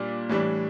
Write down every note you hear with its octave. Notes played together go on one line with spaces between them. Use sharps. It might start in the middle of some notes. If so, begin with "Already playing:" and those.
Already playing: A#2 G3 D4
A2 E3 G3 D4